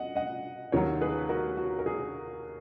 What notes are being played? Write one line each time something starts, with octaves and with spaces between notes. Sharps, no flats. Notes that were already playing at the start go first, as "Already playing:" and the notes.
Already playing: D#5 F#5
D#5 F#5
D#2 D#3 F#3 A#4 C#5
G#4 B4
F#4 A#4
F#4
A#4
G#4